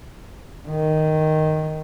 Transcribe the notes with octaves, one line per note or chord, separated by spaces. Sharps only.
D#3